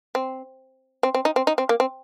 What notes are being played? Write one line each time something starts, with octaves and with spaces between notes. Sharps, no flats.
C4
C4
C4
D#4
C4
D#4
C4
A#3
C4